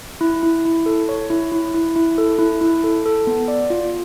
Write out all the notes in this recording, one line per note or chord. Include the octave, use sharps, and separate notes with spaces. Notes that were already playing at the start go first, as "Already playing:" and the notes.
E4
E4
E4
A4
C#5
E4
E4
E4
E4
A4
E4
E4
A4
A4
B3
D5
F4